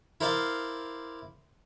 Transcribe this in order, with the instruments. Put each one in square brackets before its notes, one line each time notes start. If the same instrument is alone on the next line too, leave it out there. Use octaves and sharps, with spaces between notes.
[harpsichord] E4 A#4 C5 D5 F5